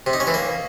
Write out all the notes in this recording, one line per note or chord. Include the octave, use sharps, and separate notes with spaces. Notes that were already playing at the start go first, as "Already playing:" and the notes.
C3
D#4
C#4
E3
A#3